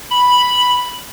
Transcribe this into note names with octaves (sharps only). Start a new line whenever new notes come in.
B5